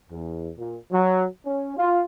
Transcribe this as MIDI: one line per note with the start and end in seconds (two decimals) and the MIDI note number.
0.12 0.51 40
0.58 0.78 46
0.92 1.24 54
1.45 1.75 61
1.76 2.04 65